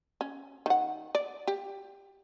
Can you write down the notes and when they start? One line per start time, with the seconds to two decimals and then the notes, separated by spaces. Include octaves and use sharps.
0.21 C#4
0.66 D#3 F#5
1.15 D5
1.47 G4